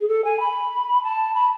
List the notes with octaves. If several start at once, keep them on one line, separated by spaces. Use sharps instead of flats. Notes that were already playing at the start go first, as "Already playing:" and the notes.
G#4
A4
G#5
B5
A5
B5